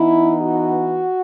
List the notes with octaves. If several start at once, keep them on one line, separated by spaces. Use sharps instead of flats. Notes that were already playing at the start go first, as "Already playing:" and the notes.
Already playing: E3 B3 D#4 E4
F#4